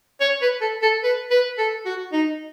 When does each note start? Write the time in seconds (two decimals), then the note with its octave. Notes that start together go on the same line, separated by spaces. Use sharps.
0.20 C#5
0.42 B4
0.61 A4
0.82 A4
1.03 B4
1.31 B4
1.58 A4
1.85 F#4
2.13 D#4